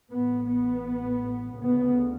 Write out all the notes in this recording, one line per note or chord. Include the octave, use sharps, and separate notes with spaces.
A1 A2 B3
B3
D2 C#3 B3